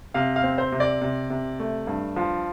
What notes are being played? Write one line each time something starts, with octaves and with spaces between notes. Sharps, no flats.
C3 F5
F5
C4
C5
C3
D5
C3
C3
A3
G2
F3